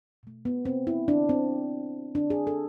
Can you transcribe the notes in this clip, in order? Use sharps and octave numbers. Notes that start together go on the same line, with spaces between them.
B2 A3
B3
C4
E4
D4
C4
D4
G#4
A4